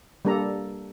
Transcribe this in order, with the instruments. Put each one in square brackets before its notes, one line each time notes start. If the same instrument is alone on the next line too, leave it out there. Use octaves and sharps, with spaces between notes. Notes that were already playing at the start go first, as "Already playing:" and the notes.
[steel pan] G3 A#3 D4 A4 A#5